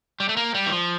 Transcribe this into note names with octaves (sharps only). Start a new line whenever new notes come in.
G3
A3
A#3
G3
E3
F3